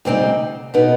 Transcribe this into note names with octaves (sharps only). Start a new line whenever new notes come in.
D2 C3 G3 C4 D#4
B2 B3 D#4